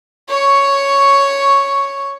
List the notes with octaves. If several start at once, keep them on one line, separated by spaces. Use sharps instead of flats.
C#5 C#6